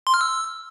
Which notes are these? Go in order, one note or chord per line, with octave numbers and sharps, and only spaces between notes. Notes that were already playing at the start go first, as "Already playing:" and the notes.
C6
F6
E6